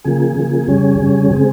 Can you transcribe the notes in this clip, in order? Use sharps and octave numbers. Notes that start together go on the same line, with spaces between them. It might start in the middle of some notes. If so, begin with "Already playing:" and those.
C#3 F3 A#3 G#4
C#3 F3 A#3
F2 C#3 G3 C#4
F2 C#3 G3 C#4
C#3 G#3 C4 G#4